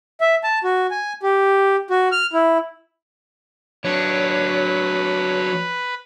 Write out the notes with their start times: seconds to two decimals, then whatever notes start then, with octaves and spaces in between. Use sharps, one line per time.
0.21 E5
0.44 A5
0.64 F#4
0.91 G#5
1.23 G4
1.90 F#4
2.12 F6
2.33 E4
3.85 F#3 D4 B4 C#5